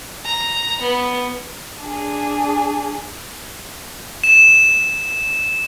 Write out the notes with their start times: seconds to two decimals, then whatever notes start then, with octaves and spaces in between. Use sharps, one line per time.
0.25 A#5
0.81 B3
1.83 D4 G#4
4.24 E7